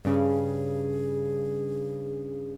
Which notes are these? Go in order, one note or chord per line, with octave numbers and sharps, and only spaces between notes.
G2 C#3 G#4